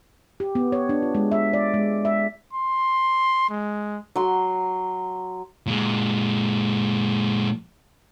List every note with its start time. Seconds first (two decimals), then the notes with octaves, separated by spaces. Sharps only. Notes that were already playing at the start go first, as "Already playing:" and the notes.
0.40 G4
0.55 B3
0.72 C#5
0.89 D4
1.02 F4
1.15 G#3
1.32 E5
1.53 D5
1.74 G#3
2.05 E5
2.53 C6
3.49 G#3
4.16 F#3 C6
5.67 A#2 G#3